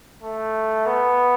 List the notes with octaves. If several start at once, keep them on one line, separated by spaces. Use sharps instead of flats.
A3
B3